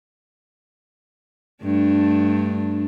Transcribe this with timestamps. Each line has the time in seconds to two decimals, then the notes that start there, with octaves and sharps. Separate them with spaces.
1.63 G2 A3 D4